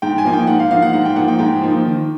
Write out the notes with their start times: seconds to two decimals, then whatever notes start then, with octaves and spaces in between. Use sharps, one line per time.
0.02 G#2 G5
0.18 G#5
0.25 F3 A#3 D#4
0.33 G5
0.47 G#2 F#5
0.60 F5
0.70 F3 A#3 D#4 F5
0.82 F#5
0.93 G#2 F#5
1.05 G5
1.16 F3 A#3 D#4 F#5
1.28 G5
1.39 G#2 G5
1.61 F3 A#3 D#4
1.85 D#3